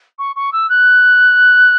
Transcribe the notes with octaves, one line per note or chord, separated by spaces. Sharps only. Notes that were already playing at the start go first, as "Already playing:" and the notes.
C#6
C#6
E6
F#6